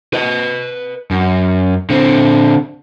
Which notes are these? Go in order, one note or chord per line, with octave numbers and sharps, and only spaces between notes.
B4 D#5
F#2
D3 C4